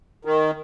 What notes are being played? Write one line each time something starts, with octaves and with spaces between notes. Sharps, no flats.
D#3